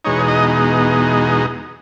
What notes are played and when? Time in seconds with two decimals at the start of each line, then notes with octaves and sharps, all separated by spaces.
0.05 E2 B2 G#3 D#4 C#5
0.28 D#5